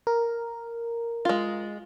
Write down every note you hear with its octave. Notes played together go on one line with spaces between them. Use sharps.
A#4
G#3 F4